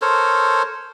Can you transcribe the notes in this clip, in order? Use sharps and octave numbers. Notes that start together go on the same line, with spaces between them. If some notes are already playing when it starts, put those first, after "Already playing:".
A4 A#4 C5 C#5